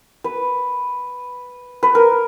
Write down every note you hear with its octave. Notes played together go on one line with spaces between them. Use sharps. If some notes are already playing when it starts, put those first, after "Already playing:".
B4
B4
A#4